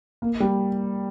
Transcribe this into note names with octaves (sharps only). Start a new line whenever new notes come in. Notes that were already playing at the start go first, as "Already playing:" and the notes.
A#3
G3